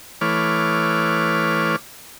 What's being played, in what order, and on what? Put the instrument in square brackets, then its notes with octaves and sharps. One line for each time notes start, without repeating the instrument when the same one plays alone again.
[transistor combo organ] E3 A3 B4 C#5 D6 F6